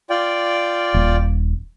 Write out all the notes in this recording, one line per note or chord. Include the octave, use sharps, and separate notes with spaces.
F4 D5 G5
D#1